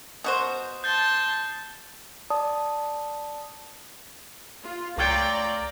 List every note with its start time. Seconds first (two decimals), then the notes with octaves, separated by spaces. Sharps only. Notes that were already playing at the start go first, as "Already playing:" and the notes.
0.24 B2 F#4 C5 D#6
0.84 A5 C6 G6 A6
2.30 D5 A5 D#6
4.62 F4
4.98 C#2 A3 F4 C#5 D5 G5 A#5